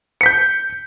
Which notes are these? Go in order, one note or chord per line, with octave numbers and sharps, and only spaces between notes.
G6 B6 C#7